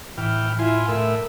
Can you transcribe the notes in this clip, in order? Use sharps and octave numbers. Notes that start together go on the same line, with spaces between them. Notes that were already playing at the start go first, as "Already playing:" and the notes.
A2 E3 G5 F6
E4 F4 G#5 C6
A2 A#4 E5